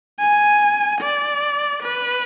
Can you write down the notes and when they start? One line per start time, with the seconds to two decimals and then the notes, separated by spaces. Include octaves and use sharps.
0.20 G#5
1.01 D5
1.83 B4